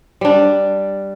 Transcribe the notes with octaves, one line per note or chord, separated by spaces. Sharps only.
G3 D4